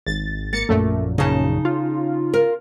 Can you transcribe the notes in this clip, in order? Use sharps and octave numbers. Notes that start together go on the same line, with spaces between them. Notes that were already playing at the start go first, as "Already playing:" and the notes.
G#1 A6
A#3 A6 C#7
A#1 F#2 A#2 A3
C#3 D#4 A5
F4
A#4